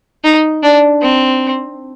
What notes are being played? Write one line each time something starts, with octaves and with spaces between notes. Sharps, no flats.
D#4
D4
C4